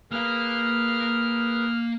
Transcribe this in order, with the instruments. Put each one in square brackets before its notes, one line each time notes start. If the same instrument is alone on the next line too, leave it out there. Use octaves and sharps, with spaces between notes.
[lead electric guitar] A#3 F5 [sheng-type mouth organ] G#4 A#4 B4 [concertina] F6